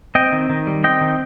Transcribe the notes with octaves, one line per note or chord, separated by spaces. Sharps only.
C4 D#5 G5
D#3
D#3
G3
C4 D#5 G5
D#3